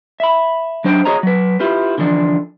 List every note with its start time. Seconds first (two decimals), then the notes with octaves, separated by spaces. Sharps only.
0.20 E5 B5
0.84 F#3 D4 C5 G5
1.05 F#4 G#4 C#5 D#5 A#5
1.23 F#3 B4
1.60 E4 F4 G4 B4
1.98 D3 E3 F3 D4